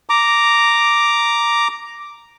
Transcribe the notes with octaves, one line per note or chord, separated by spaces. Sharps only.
A#5 D6